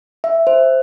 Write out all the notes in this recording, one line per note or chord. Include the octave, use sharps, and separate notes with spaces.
E5
C5